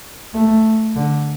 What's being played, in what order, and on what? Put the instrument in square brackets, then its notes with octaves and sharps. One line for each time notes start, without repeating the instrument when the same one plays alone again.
[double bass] A3
D3